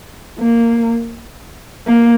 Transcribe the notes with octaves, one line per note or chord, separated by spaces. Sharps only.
A#3
A#3